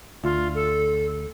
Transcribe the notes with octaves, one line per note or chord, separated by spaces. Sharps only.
D2 F4
A4